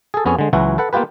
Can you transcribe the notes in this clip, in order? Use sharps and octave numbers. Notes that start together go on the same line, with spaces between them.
G#4 A4
F2 B3 C#4 G#4
D3 G#3
C#2 E3 F#3 E4 F#4
A4 B4 F#5
A#3 B3 F4 G4 B4